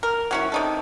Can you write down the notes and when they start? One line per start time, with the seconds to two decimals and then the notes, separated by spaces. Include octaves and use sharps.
0.03 A#4
0.31 F#3 C#4 E4
0.52 C3 D#4 A4